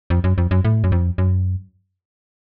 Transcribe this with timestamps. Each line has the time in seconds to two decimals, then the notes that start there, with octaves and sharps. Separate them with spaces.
0.10 F2
0.24 F#2
0.38 F2
0.51 F#2
0.65 A2
0.84 F#2
0.92 F2
1.18 F#2